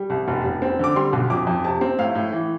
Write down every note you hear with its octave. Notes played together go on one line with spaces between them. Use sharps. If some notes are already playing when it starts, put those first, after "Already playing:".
Already playing: G3
C2
F1
F1
C4
D3 D6
G3 C6
B1
F2 D6
F2
C3 A5
C4
A2 F5
A2
E3